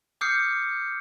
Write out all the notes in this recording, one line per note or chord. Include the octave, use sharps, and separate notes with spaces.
D6 D#6 F6 G6 C7 C#7